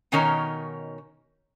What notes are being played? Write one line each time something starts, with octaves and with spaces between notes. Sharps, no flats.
B2 D#3 C#4 D#4 A#4 C#5